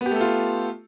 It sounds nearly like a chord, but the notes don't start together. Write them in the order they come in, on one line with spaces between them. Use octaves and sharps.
B3 G4 A3 A4 F4